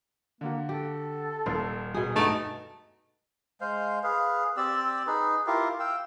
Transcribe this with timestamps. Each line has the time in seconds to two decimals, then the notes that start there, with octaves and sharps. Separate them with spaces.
0.41 D3 A#3 F#4
0.69 G4 A4
1.46 D#1 A#3 C5
1.94 B2 G#4
2.16 G2 A3 B3 D#4 D7 E7
3.61 G#3 C5 F5
4.03 G#4 B4 F5
4.57 C4 G4 D5 E6
5.07 D#4 G#4 B4
5.47 E4 F4 G4 A#4
5.80 F5 G5 E6